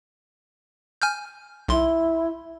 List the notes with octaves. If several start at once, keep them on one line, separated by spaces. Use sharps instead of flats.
G#5 F6 G6
B1 E4 C6